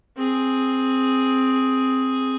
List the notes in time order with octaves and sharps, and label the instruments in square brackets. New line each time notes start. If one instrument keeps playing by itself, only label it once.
[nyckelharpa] C4 G#4